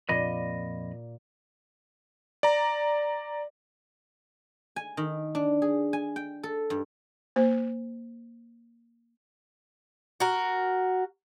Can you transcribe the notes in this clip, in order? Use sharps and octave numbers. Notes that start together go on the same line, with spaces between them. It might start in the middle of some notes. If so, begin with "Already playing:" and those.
F2 A#2 D#5 B5
D5 A#5
G#5
D#3
D4
G#4
G#5
G5
A4
G2
A#3 C5
F#4 A#4